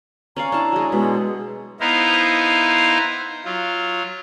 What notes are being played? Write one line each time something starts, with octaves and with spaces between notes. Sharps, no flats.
C#4 D5 F5 A#5
D4 E4 A5
F#3 G#3
B2 G#3
B3 D#4 E4 C5 F5 A#5
F#3 F4